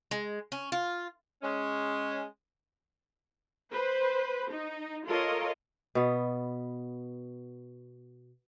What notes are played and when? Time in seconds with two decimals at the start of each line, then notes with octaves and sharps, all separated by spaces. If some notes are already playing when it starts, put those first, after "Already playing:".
0.11 G#3
0.52 C#4
0.72 F4
1.42 G#3 C#4
3.72 B4 C5
4.51 D#4
5.06 F4 A4 A#4 C#5 D#5
5.95 B2 B3